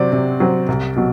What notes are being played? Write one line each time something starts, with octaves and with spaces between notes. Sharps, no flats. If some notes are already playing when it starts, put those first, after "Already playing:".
Already playing: C3 F#3 C4 D5
C3
F#3 C4
C2
B2 F#3